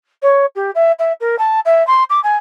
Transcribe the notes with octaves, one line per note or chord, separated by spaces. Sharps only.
C#5
G4
E5
E5
A#4
A5
E5
C6
D6
G#5